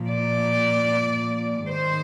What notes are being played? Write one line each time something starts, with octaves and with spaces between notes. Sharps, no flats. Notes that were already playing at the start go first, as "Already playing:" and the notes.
Already playing: A#2 F3
D5
G#2 D#3 C5